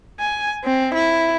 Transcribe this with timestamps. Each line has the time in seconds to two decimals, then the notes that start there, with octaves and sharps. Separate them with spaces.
0.20 G#5
0.64 C4
0.95 E4